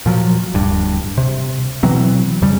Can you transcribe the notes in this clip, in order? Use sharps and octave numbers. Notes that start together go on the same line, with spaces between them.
A#2 F3 F#3
D1 G2
C3
B2 E3 F#3 C4
F2 C#3 G3